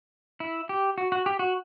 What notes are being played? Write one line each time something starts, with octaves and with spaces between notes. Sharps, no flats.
E4
G4
F#4
F#4
G4
F#4